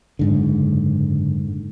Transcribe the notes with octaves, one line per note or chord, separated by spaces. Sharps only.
F#1 G#2 D3